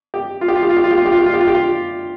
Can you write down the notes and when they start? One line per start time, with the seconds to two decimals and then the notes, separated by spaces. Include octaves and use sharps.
0.14 G4
0.41 F4
0.48 G4
0.55 F4
0.63 G4
0.70 F4
0.77 G4
0.84 F4
0.91 G4
0.98 F4
1.06 G4
1.12 F4
1.19 G4
1.26 F4
1.34 G4
1.40 F4
1.48 G4
1.55 F4